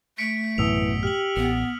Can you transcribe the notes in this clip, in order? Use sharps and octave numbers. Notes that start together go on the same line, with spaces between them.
A3 B6 C#7 D7
A1 F#2 B2 E3 D#6 E6 F7
G4 F6 F#7
A1 B3